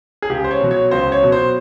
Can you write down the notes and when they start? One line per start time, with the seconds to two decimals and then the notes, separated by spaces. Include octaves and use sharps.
0.22 G#4
0.30 C#2 G4
0.44 C5
0.51 C#5
0.61 B2 F#3
0.71 C#5
0.91 C#2 C5
1.12 C#5
1.23 B2 F#3
1.32 C5